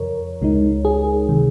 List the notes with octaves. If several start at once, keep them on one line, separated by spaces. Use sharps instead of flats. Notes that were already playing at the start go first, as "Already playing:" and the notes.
Already playing: F2 C#3 F3 A#4 C#5
C#2 C#3 G#3 D#4
G#4
C3 D#3